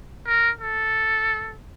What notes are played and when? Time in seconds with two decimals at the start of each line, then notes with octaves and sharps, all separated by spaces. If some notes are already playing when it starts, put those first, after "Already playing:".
0.27 A#4
0.61 A4